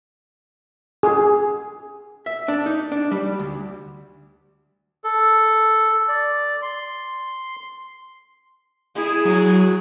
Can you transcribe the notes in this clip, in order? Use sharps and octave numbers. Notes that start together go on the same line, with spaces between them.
G#4
E5
D4
D#4
D4
G3
D2
A4
D5
C6
E4 G#4
F#3